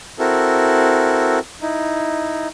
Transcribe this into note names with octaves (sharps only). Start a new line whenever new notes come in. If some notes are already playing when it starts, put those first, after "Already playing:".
C4 E4 F#4 A4 A#4
D#4 E4